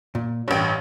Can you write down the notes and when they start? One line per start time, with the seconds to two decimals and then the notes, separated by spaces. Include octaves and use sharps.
0.15 A#2
0.48 A1 G2 C#5 G5